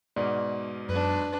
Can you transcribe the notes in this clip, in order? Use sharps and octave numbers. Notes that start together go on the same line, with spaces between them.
G#2 B2 D5
F#2 D4 B4